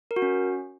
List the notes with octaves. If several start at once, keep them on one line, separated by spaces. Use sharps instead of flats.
A#4
F#4
C#4